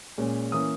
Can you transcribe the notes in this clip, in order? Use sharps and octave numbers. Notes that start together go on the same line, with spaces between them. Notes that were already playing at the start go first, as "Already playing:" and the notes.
A#2 G#3 C#4
E3 A#3 C#4 D#6